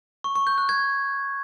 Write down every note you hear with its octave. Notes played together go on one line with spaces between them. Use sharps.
C#6
C#6
G6
F#6
G#6